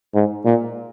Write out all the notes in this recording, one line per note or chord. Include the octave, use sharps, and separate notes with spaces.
G#2
A#2